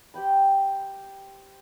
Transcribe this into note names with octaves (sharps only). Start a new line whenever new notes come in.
G4 C5 G5 B5